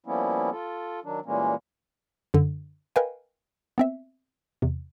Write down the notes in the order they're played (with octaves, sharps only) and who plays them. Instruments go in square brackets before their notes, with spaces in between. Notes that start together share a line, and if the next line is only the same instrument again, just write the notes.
[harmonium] F3 G3 A#3 B3 C#4 E4
F4 A4
D#3 F#3 D4
A#2 E3 G3 G#3 A#3 C#4
[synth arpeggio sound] F#2 D3
A#4 B4 D#5 F5 G5 G#5
B3 C4 E5
E2 C3